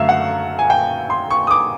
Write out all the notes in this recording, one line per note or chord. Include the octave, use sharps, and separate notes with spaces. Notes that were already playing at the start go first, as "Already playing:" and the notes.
Already playing: F#2 D3 F#3 A3 E5 F5
F#5
G#5
G5
C6
C#6
D#6
D6